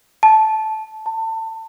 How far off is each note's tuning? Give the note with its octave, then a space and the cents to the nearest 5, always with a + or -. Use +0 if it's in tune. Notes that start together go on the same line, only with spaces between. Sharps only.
A5 -15
A5 +30